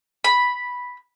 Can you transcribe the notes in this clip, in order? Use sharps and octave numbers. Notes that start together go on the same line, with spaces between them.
B5